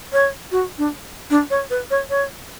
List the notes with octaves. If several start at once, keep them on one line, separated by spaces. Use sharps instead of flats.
C#5
F#4
D4
D4
C#5
B4
C#5
C#5